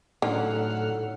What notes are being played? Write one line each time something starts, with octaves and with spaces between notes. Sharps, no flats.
A2 D3 F#3 C#4 D#4 A4 F#5 F6